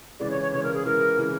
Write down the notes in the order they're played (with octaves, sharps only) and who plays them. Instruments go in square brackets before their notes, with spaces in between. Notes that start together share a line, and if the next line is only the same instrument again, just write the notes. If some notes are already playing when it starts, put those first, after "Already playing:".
[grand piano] C#3 E3 G#3 [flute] D5
[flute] C#5
C#5
[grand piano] C#3 E3 G#3 [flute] C#5
[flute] A#4
G#4
[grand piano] C#3 E3 G#3 [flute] A#4
[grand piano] C#3 E3 G#3